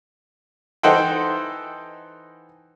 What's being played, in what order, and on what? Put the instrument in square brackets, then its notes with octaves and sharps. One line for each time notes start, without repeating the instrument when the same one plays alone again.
[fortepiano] E3 D#4 A4 C5 F#5 G5